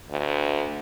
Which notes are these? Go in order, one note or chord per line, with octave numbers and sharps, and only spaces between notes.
D2